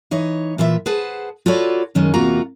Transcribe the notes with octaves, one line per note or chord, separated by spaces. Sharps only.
E3 D#4 C#5
A#2 E3 F4 E5
G#4 B4 C5 F#5 A5
F4 F#4 A4 B4 C#5 D5
F#2 D#3 G#3 C#4
E2 C3 A#3 F4 F#4 A#5